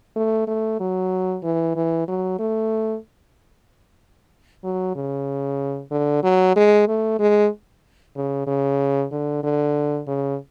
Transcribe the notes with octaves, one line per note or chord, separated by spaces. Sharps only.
A3
A3
F#3
E3
E3
F#3
A3
F#3
C#3
D3
F#3
G#3
A3
G#3
C#3
C#3
D3
D3
C#3